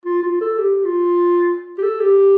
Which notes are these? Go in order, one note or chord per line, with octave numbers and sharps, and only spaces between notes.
F4
F4
A4
G4
F4
G4
A4
G4